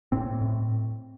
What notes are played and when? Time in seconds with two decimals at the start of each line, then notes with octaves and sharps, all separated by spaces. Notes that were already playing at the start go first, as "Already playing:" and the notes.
0.12 A2 C4
0.42 A2